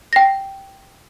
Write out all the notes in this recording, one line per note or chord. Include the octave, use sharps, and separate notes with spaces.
G5 A#6